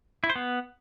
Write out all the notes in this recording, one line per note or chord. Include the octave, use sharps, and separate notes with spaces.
E4
C5
B3